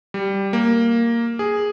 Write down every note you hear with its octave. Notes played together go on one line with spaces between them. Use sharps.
G3
A#3
G#4